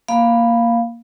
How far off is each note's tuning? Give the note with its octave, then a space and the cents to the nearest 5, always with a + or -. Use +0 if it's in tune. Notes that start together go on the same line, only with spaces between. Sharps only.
A#3 +0 F5 +0 B5 +0